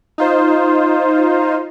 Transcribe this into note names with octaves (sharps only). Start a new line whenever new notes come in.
D#4 F4 C5